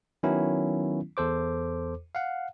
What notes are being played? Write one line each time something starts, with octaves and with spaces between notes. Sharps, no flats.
D#3 F#3 B3 C#4 E4
E2 A4 C5 D6
F5 F#5